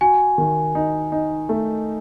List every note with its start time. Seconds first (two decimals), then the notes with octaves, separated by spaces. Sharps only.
0.01 F#4 G#5
0.38 D#3
0.75 D#4
1.12 D#4
1.49 A3